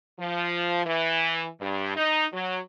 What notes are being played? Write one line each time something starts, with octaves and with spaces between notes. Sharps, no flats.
F3
E3
G2
D#4
F#3